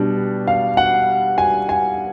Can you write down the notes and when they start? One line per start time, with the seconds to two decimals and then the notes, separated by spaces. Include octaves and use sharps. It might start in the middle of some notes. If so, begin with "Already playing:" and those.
Already playing: B2 G3 B3 D4
0.47 F5
0.77 F#5
1.38 G#5
1.69 G#5